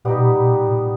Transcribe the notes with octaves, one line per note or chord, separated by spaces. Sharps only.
A#2 G3 B3 D#4 G4
B2
A#2
B2
A#2
A#2